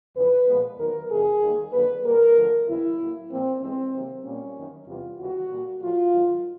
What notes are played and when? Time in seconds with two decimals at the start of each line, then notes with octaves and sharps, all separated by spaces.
0.16 E2 C#3 F3 B4
0.47 A#2 F3 G#3 B3
0.78 D#2 D#3 F#3 B3 A#4
1.10 F2 C3 E3 A3 G#4
1.41 D#2 D#3 G3 A#3
1.72 F2 D3 F#3 A#3 B4
2.04 B2 G3 A#3 A#4
2.35 G2 D3 F3 A3
2.67 D#2 C#3 F#3 B3 E4
2.99 A2 F#3 A#3
3.29 A#2 F3 A#3 C4
3.61 G2 E3 G#3 B3 C4
3.93 C3 D#3 F#3 A#3
4.25 A#2 G3 A#3 C#4
4.55 F#2 D#3 F#3
4.87 E2 C3 E3 G3 B3 F4
5.18 D#2 C#3 E3 G3 F#4
5.50 A#2 G3 A#3
5.82 A2 F3 A3 F4
6.13 G#2 D#3 F#3